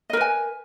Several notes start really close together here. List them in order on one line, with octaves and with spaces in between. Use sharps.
D#5 A#4 B4 G#5